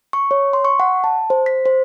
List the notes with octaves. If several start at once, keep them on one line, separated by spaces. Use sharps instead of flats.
C#6
C#5
C6
C#6
F#5
A5
C5
B6
C5